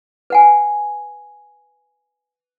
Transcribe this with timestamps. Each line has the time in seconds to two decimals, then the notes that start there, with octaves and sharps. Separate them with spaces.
0.30 B4 F#5 G#5